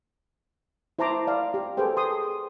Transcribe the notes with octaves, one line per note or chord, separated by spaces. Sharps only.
E4 C5 A5 A#5 C6 D6
D5 F5
G4
G#4 A4 B4 C5 G5
C6 D#6